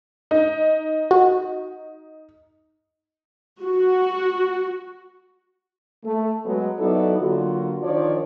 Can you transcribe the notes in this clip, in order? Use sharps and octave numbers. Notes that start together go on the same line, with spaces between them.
D#4
F#4
F#4
A3
F#3 G#3 B3
F#3 B3 D#4 E4 A4 D5
D3 F#3 A#3 F4 F#4
D#3 F3 D4 C#5 D5